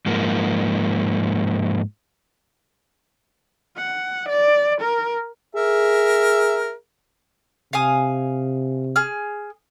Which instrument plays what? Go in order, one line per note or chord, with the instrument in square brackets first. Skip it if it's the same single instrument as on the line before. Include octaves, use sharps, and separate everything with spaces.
[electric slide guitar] G#2 F3 A#3
[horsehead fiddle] F#5
D5
A#4
[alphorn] G#4 [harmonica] A#4 E5
[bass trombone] C3 [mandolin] F5 G#5 D#6
[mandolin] G#4 F6